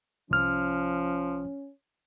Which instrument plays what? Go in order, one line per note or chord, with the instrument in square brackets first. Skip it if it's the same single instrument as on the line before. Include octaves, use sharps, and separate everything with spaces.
[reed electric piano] C2 F6 [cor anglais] F3 [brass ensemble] C#4